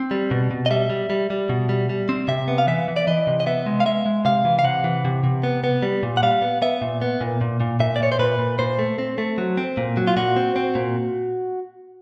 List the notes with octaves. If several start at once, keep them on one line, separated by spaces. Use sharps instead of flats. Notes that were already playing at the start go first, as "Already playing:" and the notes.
Already playing: C4
G3
B2
B2
D#5
G3 E5
G3
G3
G3
B2
G3
G3
C4
C3 E5
B3
F5
E3 E5
E3
D5
E3 D#5
C3
D#5
B3 E5
G#3
F5
G#3 E5
G#3
C3 F5
E3
F5
C3 F#5
E3
C3
C3
B3
B3
G3
A#2
F#5
G3 F5
B3
B3 E5
A#2
B3
A#2
A#2
A#2
A#2 E5
D5
A#2 C#5
C5
A#2 B4
A#2
A#2 C5
A3
C4
A3
F#3
C4
A#2
F#3
F4
A#2 F#4
C4
C4
A#2